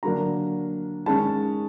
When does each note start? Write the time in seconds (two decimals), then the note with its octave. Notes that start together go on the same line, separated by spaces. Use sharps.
0.03 D3 F#3 A#3 D4 A#5
1.06 D#3 G#3 C#4 A5